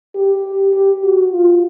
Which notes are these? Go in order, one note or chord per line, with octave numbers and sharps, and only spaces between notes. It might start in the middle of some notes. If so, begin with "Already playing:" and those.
G4
G4
F#4
F4